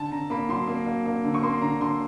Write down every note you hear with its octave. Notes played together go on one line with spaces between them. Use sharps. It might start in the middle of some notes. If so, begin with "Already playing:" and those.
Already playing: D3 A5
D3 A#5
A#3 B5
F#3 C6
A#3
A#3
A#3
D3
C#6
A#3 C6
D3 A#5
D3 C6